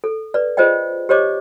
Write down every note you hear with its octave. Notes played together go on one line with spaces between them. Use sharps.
A4
B4 D5
F4 G#4 C5 D5 D#5 G5
G4 C5 C#5 D#5 D6